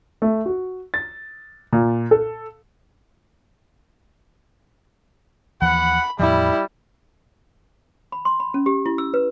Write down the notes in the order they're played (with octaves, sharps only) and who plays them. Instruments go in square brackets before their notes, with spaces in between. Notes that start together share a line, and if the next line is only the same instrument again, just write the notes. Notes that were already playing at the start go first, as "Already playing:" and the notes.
[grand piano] A3
F#4
A6
A#2
A4
[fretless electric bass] D#2 E3 F3 [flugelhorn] F#5 [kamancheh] B5
[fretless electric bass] E2 A2 F3 [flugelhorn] G3 [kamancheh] E4
[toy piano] B5
C6
B5
C#4
G4
E4
E6
B4